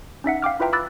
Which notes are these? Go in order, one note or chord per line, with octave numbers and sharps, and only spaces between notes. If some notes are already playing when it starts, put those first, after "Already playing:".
C#4 D#4 E5 F#5
F5 G5 D6 F6
E4 F4 B4 E5 G5 A#5
B5 D6 E6 F#6 A6